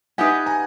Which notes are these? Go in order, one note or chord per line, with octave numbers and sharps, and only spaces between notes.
D#4 G4 B4 E5 F#5 G#5
G#5 A#5